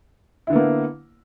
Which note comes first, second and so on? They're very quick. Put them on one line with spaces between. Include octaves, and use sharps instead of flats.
E4 D3 B3 A#3